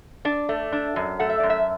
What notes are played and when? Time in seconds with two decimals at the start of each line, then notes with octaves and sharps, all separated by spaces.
0.25 D4 D5
0.49 A3
0.72 D4
0.96 F#2
1.19 A3 F#5
1.30 E5
1.40 F#2 D5
1.50 E5